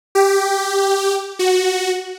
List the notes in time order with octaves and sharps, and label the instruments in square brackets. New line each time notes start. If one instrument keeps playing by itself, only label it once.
[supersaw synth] G4
F#4